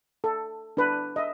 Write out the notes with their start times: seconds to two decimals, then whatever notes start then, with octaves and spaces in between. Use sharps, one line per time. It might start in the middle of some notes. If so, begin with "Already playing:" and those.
0.24 A4
0.77 D4 B4 A5
1.16 D#5 E5